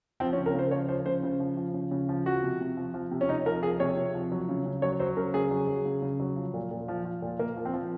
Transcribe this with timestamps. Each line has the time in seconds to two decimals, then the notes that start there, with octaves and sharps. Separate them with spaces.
0.20 F3 C4
0.33 C#4
0.38 C#3
0.46 A#4
0.55 C#3 C5
0.71 F3 C#5
0.88 F3 C5
1.06 C#3 C5
1.23 C#3
1.40 F3
1.57 F3
1.74 C#3
1.91 C#3
2.09 F3
2.26 F3 F#4
2.43 C3
2.60 C3
2.77 F3
2.94 F3
3.11 C3
3.21 C#4
3.29 C3 D#4
3.46 F3 A#4
3.63 F3 G#4
3.80 C3 C#5
3.97 C3
4.14 F3
4.32 F#3
4.49 C#3
4.66 C#3
4.82 F#3 C#5
4.99 F#3 C5
5.17 C#3 A#4
5.34 C#3 G#4
5.51 F#3
5.68 F#3
5.85 C#3
6.02 C#3
6.20 F#3
6.36 F3
6.54 A#2
6.71 A#2
6.88 F3
7.05 F3
7.22 A#2
7.39 A#2 A#3
7.56 F3
7.65 C4
7.73 F3